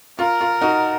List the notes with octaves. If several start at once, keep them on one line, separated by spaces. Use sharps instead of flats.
F4 A#4
F4
D#4 F#4